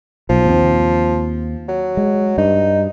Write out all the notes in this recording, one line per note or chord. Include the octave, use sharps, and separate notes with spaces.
B1 F3
D#2 C4
F#3
G#3
G2 D#4